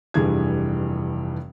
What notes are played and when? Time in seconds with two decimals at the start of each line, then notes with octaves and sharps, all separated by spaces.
0.14 F1 G2 E3 G#4 G#6